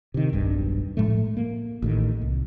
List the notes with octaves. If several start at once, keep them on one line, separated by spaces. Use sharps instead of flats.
C3 D#3
E1 B1 G2
A2 F3 G#3 A3
A#3
A1 A2 D#3
C2